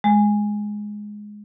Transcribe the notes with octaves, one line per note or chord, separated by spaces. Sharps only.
G#3